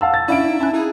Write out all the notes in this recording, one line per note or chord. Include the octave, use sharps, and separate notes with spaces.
F5 F#5 A5 E6
A6
C#4 D4 E4 F5 D7
D#4
C#4 E5 G#5 A5 F#6
D#4 E4 G#4